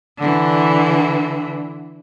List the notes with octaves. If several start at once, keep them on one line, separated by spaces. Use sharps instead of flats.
D3 E3